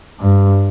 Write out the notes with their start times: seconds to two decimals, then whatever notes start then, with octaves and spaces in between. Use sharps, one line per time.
0.19 G2